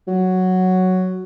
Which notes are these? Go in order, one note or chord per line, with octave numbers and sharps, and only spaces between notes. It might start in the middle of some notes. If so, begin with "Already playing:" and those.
F#3